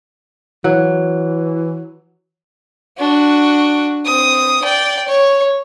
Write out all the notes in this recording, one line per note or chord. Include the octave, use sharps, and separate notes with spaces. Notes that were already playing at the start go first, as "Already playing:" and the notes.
E3 F#3
D4 F#4
C4 D#6
D5 G5
C#5